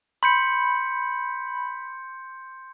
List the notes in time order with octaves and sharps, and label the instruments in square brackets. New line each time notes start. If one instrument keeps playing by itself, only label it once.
[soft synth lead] B5 [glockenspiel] C6 G6 C#7